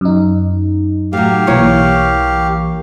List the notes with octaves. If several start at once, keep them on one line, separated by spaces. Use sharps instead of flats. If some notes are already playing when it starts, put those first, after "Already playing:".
F#2 D#4
A2 F#3 G4 F5
B1 E3 A#3 C#5 C#6